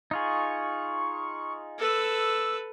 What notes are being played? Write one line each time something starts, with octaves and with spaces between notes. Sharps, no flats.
D#4 F4 G#4 C#6
A4 B4 E6